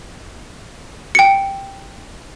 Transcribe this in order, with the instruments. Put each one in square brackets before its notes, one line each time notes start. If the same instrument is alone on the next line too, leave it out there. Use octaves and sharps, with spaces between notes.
[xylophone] G5 C#7